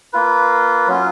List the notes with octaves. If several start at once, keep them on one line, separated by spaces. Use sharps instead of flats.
A#3 F4 B4
F#3 C#4 F4